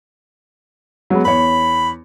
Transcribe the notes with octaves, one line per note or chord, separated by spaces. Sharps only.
F#3 G#3 B3
E2 C#5 B5